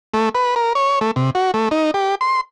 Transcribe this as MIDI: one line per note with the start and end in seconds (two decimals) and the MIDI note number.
0.14 0.29 57
0.35 0.55 71
0.56 0.73 70
0.75 0.99 73
1.01 1.11 57
1.16 1.30 48
1.35 1.51 66
1.54 1.69 57
1.71 1.91 63
1.94 2.15 67
2.21 2.41 84